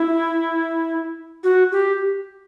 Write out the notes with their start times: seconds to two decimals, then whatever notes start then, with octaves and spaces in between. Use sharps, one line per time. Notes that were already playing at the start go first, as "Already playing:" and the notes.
Already playing: E4
1.44 F#4
1.72 G4